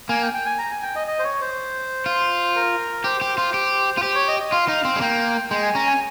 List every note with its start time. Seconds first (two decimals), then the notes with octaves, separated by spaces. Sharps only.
0.09 A#3 G#5
0.22 G5
0.34 G5
0.46 G#5
0.58 A#5
0.71 G#5
0.83 G5
0.96 D#5
1.07 D#5
1.19 C5
1.24 C#5
1.41 C5
2.06 F4
2.56 A#4
3.04 G4 C5
3.21 G4
3.38 F4
3.54 G4
3.98 F4
4.03 G4 C5
4.15 C#5
4.28 D#5
4.40 D#5
4.52 F4 F5
4.68 D#4
4.85 C4
4.96 G#3
5.01 A#3 G5
5.50 G#3 G5
5.63 G#5
5.75 C#4 A#5
5.87 G#5